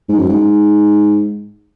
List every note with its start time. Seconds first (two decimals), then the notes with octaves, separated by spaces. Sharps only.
0.09 G#2
0.19 F#2
0.29 G#2